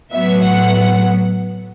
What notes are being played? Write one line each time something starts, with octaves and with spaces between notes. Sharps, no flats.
A2 F#3 B3 E5
F#5